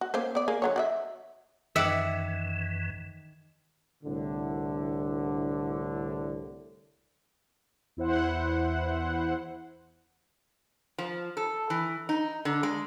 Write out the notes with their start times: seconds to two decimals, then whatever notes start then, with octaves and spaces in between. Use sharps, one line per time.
0.01 F#4
0.14 A#3 C#4 C5
0.35 B3 D5
0.48 A#3 G#4
0.62 D3 F#3 C#5
0.76 F#4 D5 E5
1.76 F#2 D#3 E3 D5 E5 F#5
4.03 C2 A2 D3
7.97 E2 E4 C5 F#5
10.98 F3
11.37 A4
11.70 E3
12.09 D#4
12.45 D3
12.63 G#3